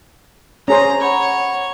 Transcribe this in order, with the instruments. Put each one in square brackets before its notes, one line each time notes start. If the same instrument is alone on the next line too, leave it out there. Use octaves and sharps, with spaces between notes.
[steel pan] C#4 G#4 C5 [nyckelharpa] A#5
[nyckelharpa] C#5 [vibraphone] F#5 B5